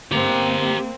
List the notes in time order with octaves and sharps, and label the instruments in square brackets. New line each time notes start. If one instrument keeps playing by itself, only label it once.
[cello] A#3 C4 [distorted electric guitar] G4 A#5